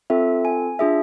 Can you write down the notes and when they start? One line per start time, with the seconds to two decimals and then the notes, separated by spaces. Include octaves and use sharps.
0.10 C4 F4 A4 E5
0.45 G#5
0.79 D4 F4 G#4 E5